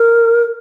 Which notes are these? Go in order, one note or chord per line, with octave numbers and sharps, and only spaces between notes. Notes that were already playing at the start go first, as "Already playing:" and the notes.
Already playing: A#4